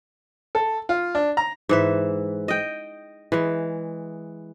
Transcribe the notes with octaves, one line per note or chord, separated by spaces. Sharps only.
A4
F4
D4
A#5
G#2 E3 E5
D#5 G5
E3 G#3